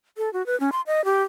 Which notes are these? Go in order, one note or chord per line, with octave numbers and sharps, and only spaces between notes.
A4
F#4
B4
C#4
C6
D#5
G4